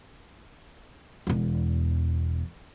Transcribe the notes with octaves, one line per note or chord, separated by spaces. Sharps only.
E1 E2